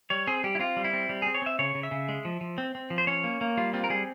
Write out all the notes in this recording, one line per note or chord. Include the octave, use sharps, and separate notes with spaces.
G3 C#5
C4 G#4
G3 G4
E4
C4 F4
G3
E4
C4
G3
C4 G#4
C#5
C4 E5
C#3 C#5
C#3
E5
C#3
G#3
F3
F3
C4
C4
F3
C5
C#4 C#5
A#3
A#3
G3 F4
C4 F4
A#4
G3 G#4